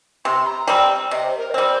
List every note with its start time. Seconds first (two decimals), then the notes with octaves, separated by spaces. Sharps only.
0.25 C3 C6
0.47 A#5
0.67 G3 C4 G5
1.11 C3 D#5
1.24 C5
1.37 A#4
1.51 D#5
1.54 G3 C4 C5